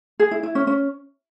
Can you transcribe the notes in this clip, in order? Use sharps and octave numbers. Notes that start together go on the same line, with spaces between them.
G#4
E4
E4
C#4
C#4